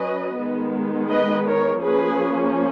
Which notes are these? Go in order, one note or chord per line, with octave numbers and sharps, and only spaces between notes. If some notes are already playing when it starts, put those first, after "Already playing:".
Already playing: F#3 C#4 B4 D#5
D#3 G#3 B3
B4 D#5
A#4 C#5
F3 A#3 C#4 G#4 B4